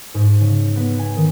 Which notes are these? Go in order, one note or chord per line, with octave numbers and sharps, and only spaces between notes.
G#2
C#3
B3
G#5
D#3